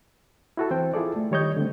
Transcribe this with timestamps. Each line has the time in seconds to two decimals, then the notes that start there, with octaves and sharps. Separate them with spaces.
0.57 E4 F#4 A4
0.71 E3 C4 C5 G5
0.94 E4 F4 G#4 A4 D5
1.16 A3
1.31 D#3 G3 C#5 D#5 G6
1.57 D3 A3 C4